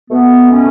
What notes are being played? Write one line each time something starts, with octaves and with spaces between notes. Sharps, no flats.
B2 A3 B3
C#4